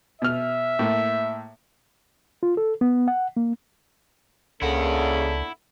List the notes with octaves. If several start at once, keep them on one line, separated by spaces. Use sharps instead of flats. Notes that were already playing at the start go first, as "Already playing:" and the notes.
B2 E5 F6
A2 A#3
F4
A4
B3
F#5
A#3
C#2 C#3 A#3 D4 E4 A4 F#5